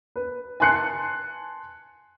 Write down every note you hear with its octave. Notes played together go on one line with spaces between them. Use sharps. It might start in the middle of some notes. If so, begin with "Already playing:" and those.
B4
G#5 A5 C6 F#6 C7 C#7